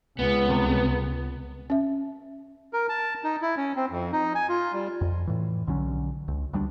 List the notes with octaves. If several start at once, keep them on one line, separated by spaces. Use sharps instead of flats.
C#2 B3
C2 C3
C#4 E5
A#4
A5
D#4
E4
C#4
C4
F2
D#4
G#5
F4
G3
F2
A2 E3
B1 D3 F#3 C#4
C#2
D2 G3 A3 D4